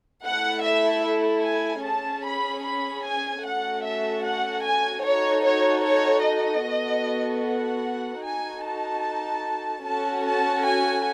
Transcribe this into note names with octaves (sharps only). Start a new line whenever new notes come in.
A3 E4 A4 F#5
E5
G#5
C#4 G#4 A5
B5
B5
G#5
A3 C#4 F#4 A4 F#5
E5
F#5
G#5
D#4 F#4 A4 C#5
C#5
C#5
D#5
B3 F#4 A4
F#5
D#4 F#4 A4 G#5
A5
C#4 F#4 A4 A5
A5
G#5